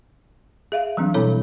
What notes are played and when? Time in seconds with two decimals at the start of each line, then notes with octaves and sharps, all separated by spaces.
0.72 G#4 E5 F5
0.97 E3 F#3 G3 C4 D4
1.14 B2 C4 E4 A4 C#5